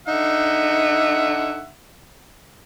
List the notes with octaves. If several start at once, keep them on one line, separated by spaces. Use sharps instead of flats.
D3 D#4 E5 F#5